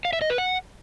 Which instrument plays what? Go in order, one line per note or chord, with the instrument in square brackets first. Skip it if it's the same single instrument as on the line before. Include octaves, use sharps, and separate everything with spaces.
[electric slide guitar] F5
E5
D#5
B4
F#5